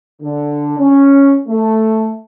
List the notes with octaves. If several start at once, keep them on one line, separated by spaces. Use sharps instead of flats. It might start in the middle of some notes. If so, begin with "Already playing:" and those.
D3
C#4
A3